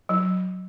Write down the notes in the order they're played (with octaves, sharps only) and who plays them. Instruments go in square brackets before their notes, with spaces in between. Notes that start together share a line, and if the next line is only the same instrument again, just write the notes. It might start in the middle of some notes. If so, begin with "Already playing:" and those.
[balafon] F#3